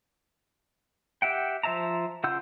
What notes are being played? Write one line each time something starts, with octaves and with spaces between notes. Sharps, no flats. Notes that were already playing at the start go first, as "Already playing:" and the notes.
G4 E5 F#5 G5
F3 C5 E5 A5 A#5
C#3 F4 F#5 E6 G6